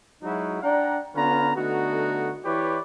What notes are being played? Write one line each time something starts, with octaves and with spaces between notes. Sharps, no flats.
F#3 G#3 D#4 E4 F#4
D4 D5 F#5 G5 A#5
D3 B3 C#4 F4 B4 A#5
D3 A3 B3 D#4 F#4
E3 E4 G4 B4 C#5 D5